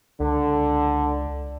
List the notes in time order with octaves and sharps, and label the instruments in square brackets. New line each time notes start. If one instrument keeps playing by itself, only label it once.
[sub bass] C#2 [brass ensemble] D3